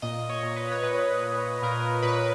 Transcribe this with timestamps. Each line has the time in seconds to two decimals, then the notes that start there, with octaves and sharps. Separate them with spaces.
0.02 A#2 D#5
0.29 C#5
0.43 A#2
0.56 B4
0.72 C#5
0.82 A#2 B4
1.23 A#2
1.62 A#2 A#4
2.02 A#2 B4